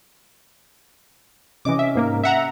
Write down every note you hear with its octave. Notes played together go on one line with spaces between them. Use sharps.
C3 E3 C#4 D#5 D6
E5
G#2 A#3 A#4
E5 F#5 A#5